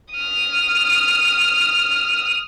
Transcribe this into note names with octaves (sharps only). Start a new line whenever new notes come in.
D#6 F6